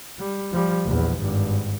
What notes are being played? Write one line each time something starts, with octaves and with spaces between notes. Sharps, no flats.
G3
F3 G3
A#1 E2
G#1 G2